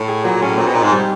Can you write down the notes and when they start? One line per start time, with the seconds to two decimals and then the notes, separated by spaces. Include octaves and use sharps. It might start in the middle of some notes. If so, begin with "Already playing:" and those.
Already playing: A2
0.08 G#4
0.25 A#2 F#3
0.42 A2 C#4
0.58 A#2 C4
0.66 B2
0.74 A#2 D#4
0.83 G#2
0.91 G3